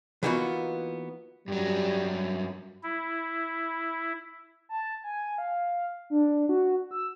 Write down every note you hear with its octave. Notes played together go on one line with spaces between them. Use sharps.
E3 A#3 B3 D#4 F4 F#4
G2 F#3 G3
E4
A5
G#5
F5
D4
F#4
E6